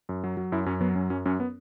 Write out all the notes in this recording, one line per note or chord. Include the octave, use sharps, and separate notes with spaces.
F#2
F#3
F#3
F#2 E4
F#2 C#4
F#3 B3
F#2 C#4
F#2 C#4
F#2 C#4
B3